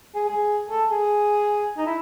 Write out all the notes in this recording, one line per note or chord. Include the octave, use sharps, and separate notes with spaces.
G#4
G#4
A4
G#4
D#4
E4